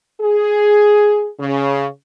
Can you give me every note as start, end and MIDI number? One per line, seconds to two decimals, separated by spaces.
0.21 1.30 68
1.40 1.86 49